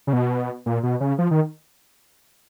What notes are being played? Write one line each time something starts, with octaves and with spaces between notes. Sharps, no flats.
C#3
B2
A#2
B2
C#3
F3
D#3